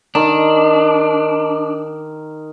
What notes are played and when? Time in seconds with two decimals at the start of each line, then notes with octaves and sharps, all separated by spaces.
0.15 D#3 D4